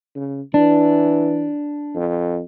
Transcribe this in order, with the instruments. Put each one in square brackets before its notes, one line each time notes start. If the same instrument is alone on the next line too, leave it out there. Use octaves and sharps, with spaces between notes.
[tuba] C#3
[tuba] E3 [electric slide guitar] D4
[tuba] F2